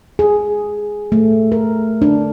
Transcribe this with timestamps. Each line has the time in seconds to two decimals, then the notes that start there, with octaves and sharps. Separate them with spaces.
0.19 G#4
1.12 A3
1.52 A#4
2.02 D4